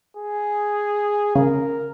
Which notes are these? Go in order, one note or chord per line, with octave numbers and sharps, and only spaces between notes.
G#4
C#3 A#4